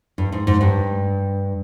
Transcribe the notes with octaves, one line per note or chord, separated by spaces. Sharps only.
G2
G#2
G#2
G2